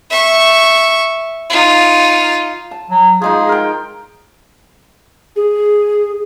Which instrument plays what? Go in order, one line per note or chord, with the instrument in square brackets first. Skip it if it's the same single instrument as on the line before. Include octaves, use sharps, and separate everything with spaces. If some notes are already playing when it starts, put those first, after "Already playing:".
[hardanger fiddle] E5 C#6
D#4 F4
[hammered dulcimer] A5
[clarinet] F#3
[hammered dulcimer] F3 G#3 D#4 [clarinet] G#4
[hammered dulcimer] A#4 G5
[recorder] G#4